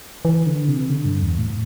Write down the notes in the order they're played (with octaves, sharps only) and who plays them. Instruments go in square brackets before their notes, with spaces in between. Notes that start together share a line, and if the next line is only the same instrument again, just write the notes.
[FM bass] E3
D3
C3
D3
G2
E2
A2